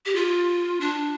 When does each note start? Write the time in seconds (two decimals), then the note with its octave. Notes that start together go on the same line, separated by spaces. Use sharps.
0.06 G4
0.16 F4
0.81 D4